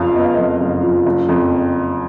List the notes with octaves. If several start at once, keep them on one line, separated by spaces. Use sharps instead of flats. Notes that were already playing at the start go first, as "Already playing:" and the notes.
Already playing: F#1 F2 F3 F5
B3 D#5
F5
F2 D#5
F#1
F3
F#1
F2